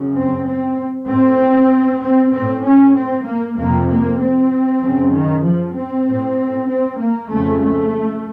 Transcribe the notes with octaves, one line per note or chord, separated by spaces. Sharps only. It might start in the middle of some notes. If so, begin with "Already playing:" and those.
Already playing: F#2 C#3
C4
C4
A2 C4
C4
A2 C4
C#4
C4
A#3
F2 C3 A#3
A#3
C4
F#2 C#3
D#3
F3
C4
A2
C4
A#3
F2 C#3 A3
A3